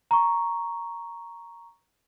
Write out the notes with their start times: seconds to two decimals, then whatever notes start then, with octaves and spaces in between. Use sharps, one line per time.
0.11 A#5 C#6